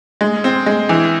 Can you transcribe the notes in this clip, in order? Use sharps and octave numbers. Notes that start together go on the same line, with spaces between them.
G#3
C4
G#3
E3